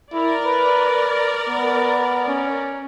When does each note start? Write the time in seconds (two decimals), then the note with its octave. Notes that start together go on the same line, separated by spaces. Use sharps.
0.13 E4 A#4 D5
0.46 B4
1.49 B3
2.28 C#4